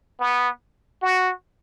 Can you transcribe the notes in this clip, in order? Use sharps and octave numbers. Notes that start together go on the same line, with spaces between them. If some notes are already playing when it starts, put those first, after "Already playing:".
B3
F#4